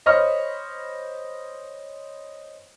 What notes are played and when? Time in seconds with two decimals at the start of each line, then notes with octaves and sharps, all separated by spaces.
0.06 C5 C#5 D#5 B5 C#6 F6